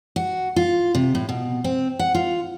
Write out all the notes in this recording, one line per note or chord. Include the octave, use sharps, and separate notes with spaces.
F#4
F4
C3
A2
B2
C4
F#5
F4